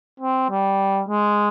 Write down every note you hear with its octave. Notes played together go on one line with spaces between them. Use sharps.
C4
G3
G#3